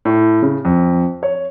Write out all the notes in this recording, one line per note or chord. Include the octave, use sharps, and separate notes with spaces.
A2
C#3
F2
C#5